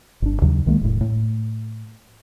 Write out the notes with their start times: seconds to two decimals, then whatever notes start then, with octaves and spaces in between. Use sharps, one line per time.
0.22 G1 D4
0.42 D#2 C#3 F#3
0.66 C2 D#3 G#3 A#3
0.81 E1 A2
1.01 A2